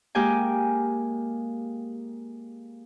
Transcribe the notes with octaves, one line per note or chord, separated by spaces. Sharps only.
G#3 A#3 G4 G5 G#5